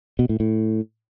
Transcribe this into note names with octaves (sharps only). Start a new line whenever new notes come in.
B2
A2
A2